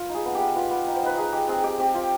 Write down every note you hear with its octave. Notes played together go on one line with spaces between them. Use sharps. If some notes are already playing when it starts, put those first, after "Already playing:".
Already playing: F4 B4
D#4
G#4
B3
G4
B3
B3 F4
B3
D#4
C5
D#4 B4
D#4 G#4
G#3 G4
C4 G#4
G#3 G4
C4 G4
C4 F4